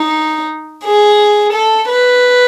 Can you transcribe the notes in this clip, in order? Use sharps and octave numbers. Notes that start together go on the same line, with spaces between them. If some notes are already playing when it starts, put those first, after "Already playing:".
Already playing: D#4
G#4
A4
B4